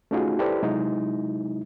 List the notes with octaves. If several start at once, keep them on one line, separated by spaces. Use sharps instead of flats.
A3 C#4 D#4 F4 F#4 G#4
E4 G4 A4 B4 C5 D5
C3 F#3 G#3 D#4 E4